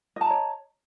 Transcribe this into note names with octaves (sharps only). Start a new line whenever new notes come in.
C#5 D#5 A5 A#5